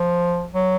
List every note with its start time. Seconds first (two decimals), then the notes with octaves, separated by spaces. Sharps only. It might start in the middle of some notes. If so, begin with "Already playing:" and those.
Already playing: F3
0.54 F#3